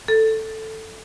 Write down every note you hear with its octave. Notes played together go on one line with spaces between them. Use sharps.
A4